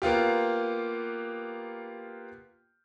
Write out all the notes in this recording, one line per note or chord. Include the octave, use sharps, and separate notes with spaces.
A#3 B3 F4 G4